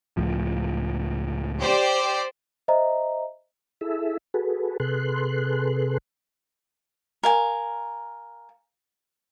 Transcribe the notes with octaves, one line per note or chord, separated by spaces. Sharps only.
C#2 A2 F3
G4 C5 D5
C5 D#5 E5 A#5
E4 G#4 A4 E5
F#4 G#4 A4 B4
C3 G#4 A4 B4 C6 F#6
A#4 F5 G#5